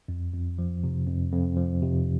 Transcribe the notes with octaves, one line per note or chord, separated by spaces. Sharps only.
F2
F2
F3
C3
F2
F2
F3
C3